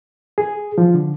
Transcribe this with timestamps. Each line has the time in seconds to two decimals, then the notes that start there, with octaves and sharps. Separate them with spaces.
0.38 G#4
0.78 F3
0.94 D3